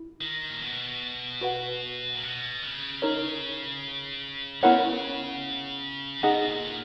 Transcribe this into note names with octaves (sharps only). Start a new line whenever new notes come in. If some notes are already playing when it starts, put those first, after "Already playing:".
Already playing: E4
D#3
A#2
B2
F#4 B4 F#5
A#2
B2
C#3
D#4 A#4 C#5
C#3 B3 E4 A#4 C#5 F#5
B2 D#4 G#4 D#5 F#5
A#2